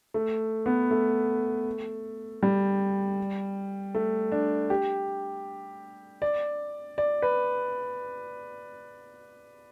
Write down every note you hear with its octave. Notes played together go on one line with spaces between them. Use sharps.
A3
B3
A3
G3
A3
D4
G4
D5
D5
B4